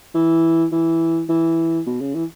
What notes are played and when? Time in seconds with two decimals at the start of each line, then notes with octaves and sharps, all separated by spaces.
0.15 E3
0.72 E3
1.29 E3
1.86 B2
2.01 C#3
2.15 E3